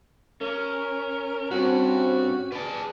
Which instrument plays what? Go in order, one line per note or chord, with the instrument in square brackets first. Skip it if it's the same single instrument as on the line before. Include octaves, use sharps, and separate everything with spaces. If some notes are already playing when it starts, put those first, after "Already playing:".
[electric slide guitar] C#4 [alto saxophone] A#4
[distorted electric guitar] G2 [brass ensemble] C4 [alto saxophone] F#4
[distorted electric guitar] G#4 D5 [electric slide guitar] B4 A5